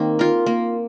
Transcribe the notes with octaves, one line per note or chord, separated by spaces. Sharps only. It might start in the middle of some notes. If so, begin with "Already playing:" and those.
Already playing: D#3 A#3 C4
F4 A#4
A#3